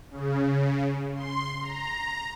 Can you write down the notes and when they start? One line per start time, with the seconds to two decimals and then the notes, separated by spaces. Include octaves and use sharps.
0.11 C#3
1.14 C6
1.61 A#5